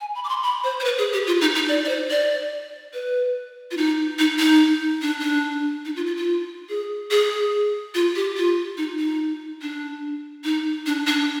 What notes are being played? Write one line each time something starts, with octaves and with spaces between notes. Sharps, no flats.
G#5
B5
D6
C6
B5
C5
C5
B4
G#4
G4
F4
D#4
D#4
D5
D5
C5
D5
B4
F4
D#4
D#4
D#4
D4
D4
D#4
F4
F4
F4
G#4
G#4
F4
G4
F4
D#4
D#4
D4
D#4
D4
D4